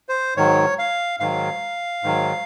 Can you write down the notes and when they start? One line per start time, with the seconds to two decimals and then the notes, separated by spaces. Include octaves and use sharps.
0.09 C5
0.37 G#2 D#3 F#3 C#5
0.79 F5
1.20 G#2 D#3 F#3 F5
2.03 G#2 D#3 F#3